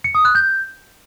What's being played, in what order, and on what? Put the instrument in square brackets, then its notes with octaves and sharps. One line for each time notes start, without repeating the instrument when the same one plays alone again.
[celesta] C#7
D#6
F#6
G6